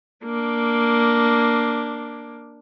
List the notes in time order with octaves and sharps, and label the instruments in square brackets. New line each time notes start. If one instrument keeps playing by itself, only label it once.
[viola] A#3 D4